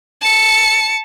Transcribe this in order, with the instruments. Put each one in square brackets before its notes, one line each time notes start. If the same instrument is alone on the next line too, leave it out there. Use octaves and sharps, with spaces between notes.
[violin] A5 C#7